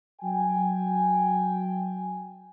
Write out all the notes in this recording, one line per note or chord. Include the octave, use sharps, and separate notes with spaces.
F#3 G5 G#5